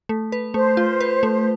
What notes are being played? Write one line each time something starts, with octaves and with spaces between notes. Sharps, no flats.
A3
B4
A3 C5
F4
B4
A3